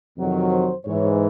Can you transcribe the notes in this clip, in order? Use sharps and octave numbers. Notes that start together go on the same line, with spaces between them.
F2 C3 D#3 F#3
C5
G#2 E3 C#5